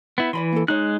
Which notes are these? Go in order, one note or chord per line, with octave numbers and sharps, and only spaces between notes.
B3 E4
E3 D5 B5 C6
A#3 A4
G#3 D#4 C#5 F#6